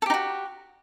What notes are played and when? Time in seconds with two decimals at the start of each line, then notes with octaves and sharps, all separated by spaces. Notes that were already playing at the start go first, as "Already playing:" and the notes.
0.02 A4
0.06 G4
0.10 D#4
0.14 F#4